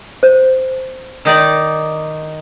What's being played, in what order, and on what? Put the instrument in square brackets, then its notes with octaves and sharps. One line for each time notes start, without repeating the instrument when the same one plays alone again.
[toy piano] C5
[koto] D#3 D#4 D5